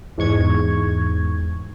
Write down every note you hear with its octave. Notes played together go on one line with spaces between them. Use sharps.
E2 G#2 C#6 G#6